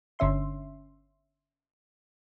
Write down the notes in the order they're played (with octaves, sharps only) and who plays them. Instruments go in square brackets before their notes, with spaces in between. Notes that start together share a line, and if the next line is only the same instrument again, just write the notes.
[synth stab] G1 D3 C#4 E5 C6